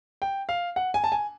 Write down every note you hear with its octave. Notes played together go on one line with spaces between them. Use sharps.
G5
F5
F#5
G#5
A5
G#5